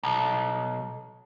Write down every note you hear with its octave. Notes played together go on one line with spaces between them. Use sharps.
B1